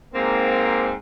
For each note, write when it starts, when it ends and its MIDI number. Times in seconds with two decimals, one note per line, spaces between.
0.14 0.93 44
0.14 0.93 58
0.14 0.93 60